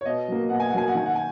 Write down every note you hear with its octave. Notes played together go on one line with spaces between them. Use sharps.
C#5
B2 D#5
F#3 A#3
B2 F#5
G#5
F#5
F#3 A#3 G#5
F#5
D#3 G#5
F#5
G#5